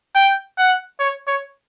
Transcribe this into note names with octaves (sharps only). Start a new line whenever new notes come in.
G5
F#5
C#5
C#5